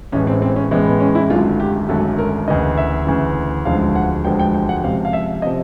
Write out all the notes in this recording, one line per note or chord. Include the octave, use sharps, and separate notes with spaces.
A1 A2 E3 G#3 C#4
C4
C4
C#4
A1 A2 E3 G#3 B3
B3
C#4
E4
G#1 F#2 D3 F#3 A3 F4
G4
G#1 F#2 D3 F#3 A3 A4
A#4
D2 C#3 E3 D#5
E5
D2 C#3 E3
E1 D2 D3 F3 G#3 F5
F#5
E1 D2 D3 F3 G#3 G5
G5
G5
F#5
C#2 C3 F3 F5
F5
E5
C3 F3 D#5